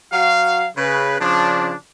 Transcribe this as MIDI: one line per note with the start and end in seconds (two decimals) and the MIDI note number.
0.13 0.66 54
0.13 0.66 66
0.13 0.66 77
0.78 1.18 49
0.78 1.18 71
1.21 1.73 49
1.21 1.73 53
1.21 1.73 62